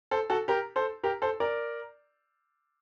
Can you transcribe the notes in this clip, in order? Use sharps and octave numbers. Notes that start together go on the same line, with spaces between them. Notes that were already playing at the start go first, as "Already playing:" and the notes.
A4 C5
F#4 A4
G4 A#4
A4 C5
G4 A#4
A4 C5
A#4 D5